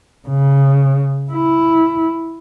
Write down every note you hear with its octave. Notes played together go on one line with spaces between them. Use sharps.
C#3
E4